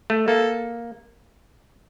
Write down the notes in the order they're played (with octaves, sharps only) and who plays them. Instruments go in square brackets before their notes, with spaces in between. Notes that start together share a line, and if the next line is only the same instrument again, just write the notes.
[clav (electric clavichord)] A3
[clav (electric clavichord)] A#3 [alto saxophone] A4